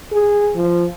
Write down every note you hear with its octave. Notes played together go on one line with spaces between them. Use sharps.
G#4
F3